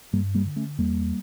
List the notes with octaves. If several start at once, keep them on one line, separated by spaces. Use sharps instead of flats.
G2 G3 A#3
G3 A#3
D3
A3 C#4
E2 G3 A#3